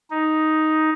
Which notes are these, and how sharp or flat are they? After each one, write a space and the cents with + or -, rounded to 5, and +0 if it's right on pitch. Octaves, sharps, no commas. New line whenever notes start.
D#4 +5